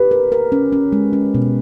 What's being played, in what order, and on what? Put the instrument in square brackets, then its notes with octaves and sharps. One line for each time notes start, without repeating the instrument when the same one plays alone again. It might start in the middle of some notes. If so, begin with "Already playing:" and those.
Already playing: [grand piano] G4 B4
[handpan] A#4
A#4
C#4
C#4
G#3
C#4
B2